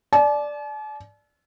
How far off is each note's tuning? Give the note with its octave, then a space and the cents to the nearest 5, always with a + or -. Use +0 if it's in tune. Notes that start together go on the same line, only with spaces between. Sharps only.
D5 +0 A5 -45